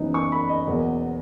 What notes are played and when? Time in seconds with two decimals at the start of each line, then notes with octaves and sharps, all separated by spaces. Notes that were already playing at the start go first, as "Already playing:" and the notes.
Already playing: F#1 F#2 E3 B3 D#4
0.14 C#6
0.32 B5
0.49 D#5
0.67 E2 B2 F#3 A#3